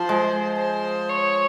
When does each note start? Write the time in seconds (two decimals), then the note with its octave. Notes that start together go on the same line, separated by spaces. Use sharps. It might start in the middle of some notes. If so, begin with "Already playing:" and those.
Already playing: F3 C5
0.09 G#3
0.59 C5
1.09 C#5